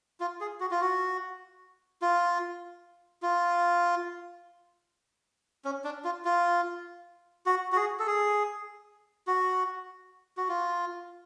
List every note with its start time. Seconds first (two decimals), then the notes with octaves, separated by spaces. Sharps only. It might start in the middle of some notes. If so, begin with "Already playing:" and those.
0.20 F4
0.41 G#4
0.60 F#4
0.71 F4
0.81 F#4
2.02 F4
3.22 F4
5.65 C#4
5.84 D4
6.04 F4
6.25 F4
7.46 F#4
7.72 F#4
7.76 G#4
7.99 A4
8.07 G#4
9.27 F#4
10.37 F#4
10.49 F4